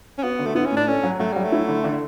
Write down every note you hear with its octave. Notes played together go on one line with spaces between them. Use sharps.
C#4
B3 F#4
D3
A3
B3 E4
C#4
A2 D4
C#4 A4
F#3
F#3 A3
F#3 G3
A3
E4
D3
D3